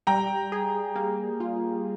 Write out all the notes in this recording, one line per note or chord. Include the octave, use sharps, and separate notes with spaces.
G3 G5 A#5
G#4
A#3
F4